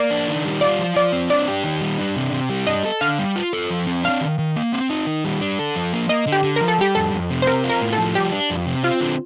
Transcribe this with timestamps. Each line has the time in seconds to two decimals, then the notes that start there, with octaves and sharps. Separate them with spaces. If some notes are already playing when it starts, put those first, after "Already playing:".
Already playing: A#3 D5
0.11 D4
0.28 D#3
0.44 G3
0.61 F4 D5
0.79 F3
0.96 F3 D5
1.12 C4
1.30 D4 D5
1.48 G4
1.64 D#3
1.81 G3
1.98 D4
2.16 C3
2.32 C3
2.50 G3
2.67 D4 D#5
2.85 A4
3.01 D3 F5
3.19 G3
3.36 F4
3.53 A4
3.70 F3
3.87 C4
4.04 D4 F5
4.21 D#3
4.39 D#3
4.56 A#3
4.73 C4
4.89 D#4
5.07 D#3
5.25 G3
5.41 D4
5.59 A4
5.76 F3
5.93 A#3
6.09 A#3 D#5
6.27 D3
6.32 G4
6.44 D3
6.56 F3 A#4
6.68 A4
6.79 G3 G4
6.95 F2 A4
7.13 F2
7.30 C3
7.42 C5
7.47 C4 A#4
7.64 F4
7.69 A#4
7.82 A2
7.93 A4
7.98 F3
8.15 G3 G4
8.32 D4
8.50 F2
8.66 C3
8.83 C4 F4
9.01 D3